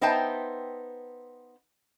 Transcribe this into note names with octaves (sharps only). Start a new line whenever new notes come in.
B3 D#4 C5 E5 G5 A5